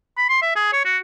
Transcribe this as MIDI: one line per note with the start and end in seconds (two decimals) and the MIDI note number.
0.18 0.28 83
0.29 0.41 84
0.42 0.51 76
0.56 0.71 68
0.73 0.81 73
0.85 0.98 66